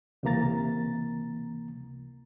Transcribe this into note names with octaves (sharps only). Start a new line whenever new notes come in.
C#2 C3 E3 A#3 A#5 A6